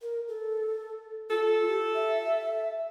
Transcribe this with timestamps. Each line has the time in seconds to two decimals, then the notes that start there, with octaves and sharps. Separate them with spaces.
0.01 A#4
0.28 A4
1.30 F4 A4
1.67 G4
1.94 E5